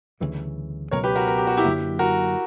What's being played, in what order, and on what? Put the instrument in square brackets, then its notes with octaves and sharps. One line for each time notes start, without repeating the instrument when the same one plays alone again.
[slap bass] D2 C#3 E3 G3
[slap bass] C#2 B2 F#3 B3 [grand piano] A#4 C#5
[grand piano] G4 B4
F#4 A#4
A#4
G4
F#4
E4 G4
[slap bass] F#2 D3 F#3 A#3
[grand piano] F#4 A#4